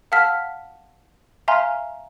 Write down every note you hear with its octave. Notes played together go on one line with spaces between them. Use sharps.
F5 F#5 A5 E6 F6 B6
E5 F5 G#5 A#5 C6 F6